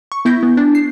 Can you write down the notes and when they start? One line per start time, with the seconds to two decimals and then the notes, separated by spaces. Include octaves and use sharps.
0.12 C#6
0.25 B3 E4 G6 A#6
0.43 B3
0.57 D4
0.75 C7